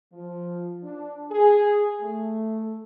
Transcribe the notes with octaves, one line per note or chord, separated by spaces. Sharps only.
F3
D4
G#4
A3